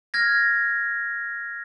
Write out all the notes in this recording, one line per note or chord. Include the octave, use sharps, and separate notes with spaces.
F6 G#6 A#6